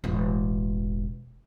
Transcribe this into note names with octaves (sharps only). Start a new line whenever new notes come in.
E1 A1